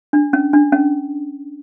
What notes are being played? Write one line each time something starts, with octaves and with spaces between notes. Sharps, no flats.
D4
C#4
D4
C#4